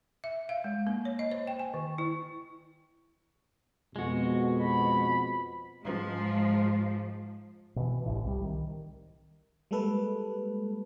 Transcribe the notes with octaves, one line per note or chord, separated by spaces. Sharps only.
E5
F5
G#3
A#3
C#5
D#5
C5
G5
G#5
D#3
E4
F2 B2 G#3 F#4
B5
G#2 F3 G#3
B2 E3
G1 C2 A2
C2 G3
D#3
G3 G#3 A#3 A4 B4